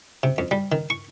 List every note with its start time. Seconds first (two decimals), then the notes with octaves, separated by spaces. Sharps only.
0.23 C3
0.38 F2
0.51 G3
0.72 D#3
0.90 C#6